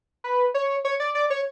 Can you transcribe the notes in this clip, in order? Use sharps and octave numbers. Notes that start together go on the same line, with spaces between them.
B4
C#5
C#5
D5
D5
C#5